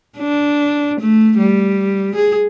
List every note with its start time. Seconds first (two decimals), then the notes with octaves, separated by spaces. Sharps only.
0.18 D4
1.00 A3
1.38 G3
2.15 G#4